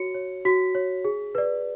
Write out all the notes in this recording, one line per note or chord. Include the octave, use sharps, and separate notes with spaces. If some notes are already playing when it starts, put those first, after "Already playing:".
Already playing: F#4 C#5 C#7
C#5
F#4 B6
C#5
G#4
B4 D5